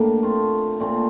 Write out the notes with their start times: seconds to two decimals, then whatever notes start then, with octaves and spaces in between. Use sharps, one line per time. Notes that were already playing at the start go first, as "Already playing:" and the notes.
Already playing: A2 G3 A#3 D4
0.23 A3 C4 F4
0.80 A#2 A3 C4